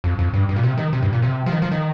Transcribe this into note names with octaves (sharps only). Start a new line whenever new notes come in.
F2
F2
G2
G2
A#2
C3
D#3
C3
G2
A#2
C3
F3
D#3
F3
D#3